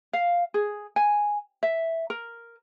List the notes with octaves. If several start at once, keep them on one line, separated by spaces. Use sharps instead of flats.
F5
G#4
G#5
E5
A#4